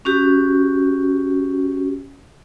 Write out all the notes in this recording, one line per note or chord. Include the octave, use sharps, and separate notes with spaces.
C#4 F#4 G4